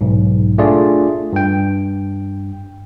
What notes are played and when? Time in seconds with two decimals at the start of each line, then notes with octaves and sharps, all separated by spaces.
0.01 B1 G#2
0.58 A3 D4 F4 G#4 D5
1.33 G2 G5